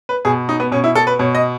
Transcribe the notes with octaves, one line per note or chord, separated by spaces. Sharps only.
B4
B2 G#4
D#4
B3
B2 C#4
E4
A4
B4
B2 C#5
D#5